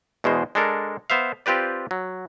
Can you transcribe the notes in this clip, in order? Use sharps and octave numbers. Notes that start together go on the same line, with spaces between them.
E2 B2 G#3 C5
G#3 D4 A4 A#4
B3 C5 E5 F5
C4 F4 G4 B4 D5
F#3